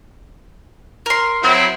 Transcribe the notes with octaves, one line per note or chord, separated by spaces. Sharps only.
A#4 C6
F#3 C4 E4